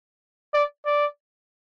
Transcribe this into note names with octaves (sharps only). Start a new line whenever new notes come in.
D5
D5